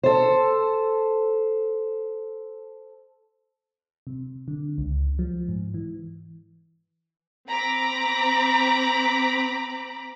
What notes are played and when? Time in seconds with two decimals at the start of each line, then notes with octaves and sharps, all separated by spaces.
0.03 A4 C5
4.07 C3
4.48 D3
4.78 C#2
5.19 F3
5.49 G#2
5.74 E3
7.47 C4 A#5 B5 D6